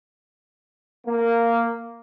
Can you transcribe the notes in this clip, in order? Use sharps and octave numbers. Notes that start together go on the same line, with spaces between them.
A#3